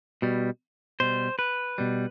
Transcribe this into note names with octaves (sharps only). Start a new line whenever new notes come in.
B2 G3
B2 G3 C5
B4
B2 G3